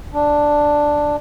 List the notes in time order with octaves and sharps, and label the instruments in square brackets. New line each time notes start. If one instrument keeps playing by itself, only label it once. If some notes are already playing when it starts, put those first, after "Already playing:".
[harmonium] D4